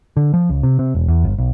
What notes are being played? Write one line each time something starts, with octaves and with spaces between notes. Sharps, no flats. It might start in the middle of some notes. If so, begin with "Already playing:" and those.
D3
F3
C#2
C3
C3
E1
E2
G1
B1